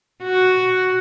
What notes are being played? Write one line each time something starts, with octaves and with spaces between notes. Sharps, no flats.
F#4